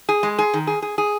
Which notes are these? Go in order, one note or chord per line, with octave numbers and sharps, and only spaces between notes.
G#4
G#3
G#4
D#3
G#4
G#4
G#4